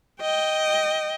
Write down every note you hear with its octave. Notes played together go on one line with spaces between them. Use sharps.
D#5 G5